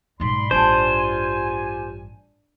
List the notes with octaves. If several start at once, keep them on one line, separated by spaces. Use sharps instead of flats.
B1 G#2 D5 B5 C6
A1 G2 D4 F4 G4 C5 G#5